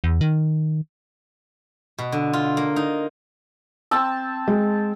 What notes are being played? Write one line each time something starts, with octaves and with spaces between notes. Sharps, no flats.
E2
D#3
B2
D3
F4
A#3
D#4
C4 A5 E6
G#3